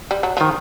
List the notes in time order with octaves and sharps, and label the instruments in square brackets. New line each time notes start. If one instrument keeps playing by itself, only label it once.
[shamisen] G3
F#3
[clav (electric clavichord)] D#3 [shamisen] F3